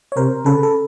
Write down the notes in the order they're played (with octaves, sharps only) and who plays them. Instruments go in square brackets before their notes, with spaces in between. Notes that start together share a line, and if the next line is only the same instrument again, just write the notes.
[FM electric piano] C#5
[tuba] C3 [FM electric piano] A#4 C5
[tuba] C#3 [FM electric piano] A4 B4
[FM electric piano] A4